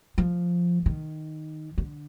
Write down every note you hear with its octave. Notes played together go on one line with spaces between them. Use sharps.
F3
D#3
D3